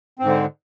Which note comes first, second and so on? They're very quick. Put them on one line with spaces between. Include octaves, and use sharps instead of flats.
C4 G#2 D3